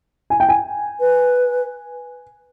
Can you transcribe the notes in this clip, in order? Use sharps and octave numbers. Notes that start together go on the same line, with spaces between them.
G#5
G5
G#5
B4